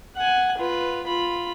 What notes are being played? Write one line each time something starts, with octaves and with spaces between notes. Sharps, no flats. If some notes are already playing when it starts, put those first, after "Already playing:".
F#5 G#5
F4 B4
F4 B5